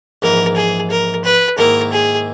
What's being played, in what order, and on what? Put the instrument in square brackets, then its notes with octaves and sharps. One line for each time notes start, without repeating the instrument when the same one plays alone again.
[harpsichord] A#1 G#2 E3 [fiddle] A#4
[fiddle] G#4
A#4
B4
[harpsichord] G#2 D#3 A#3 E4 [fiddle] A#4
[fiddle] G#4